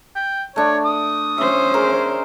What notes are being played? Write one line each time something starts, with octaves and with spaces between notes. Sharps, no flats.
G5
A3 D4 C#5
D#6
C#4 C5 E5
G#4 A#4